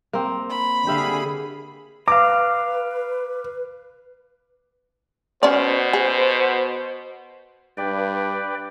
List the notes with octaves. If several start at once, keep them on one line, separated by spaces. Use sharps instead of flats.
A#3 C4
B5
D3 G4 G#4 E5 F5
B4 F5 A#5 D6
B2 C#4 C5 D5
G#4
G2 B4 D5 G5